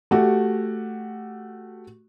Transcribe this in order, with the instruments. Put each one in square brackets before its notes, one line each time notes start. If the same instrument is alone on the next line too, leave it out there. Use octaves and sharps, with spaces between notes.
[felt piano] A3 F#4 G4